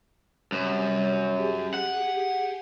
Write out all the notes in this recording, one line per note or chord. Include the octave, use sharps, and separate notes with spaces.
F#2 C3 G3 D#6
G4 G#4
F#5